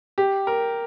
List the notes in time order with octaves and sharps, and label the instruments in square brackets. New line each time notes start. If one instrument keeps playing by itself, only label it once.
[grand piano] G4
A#4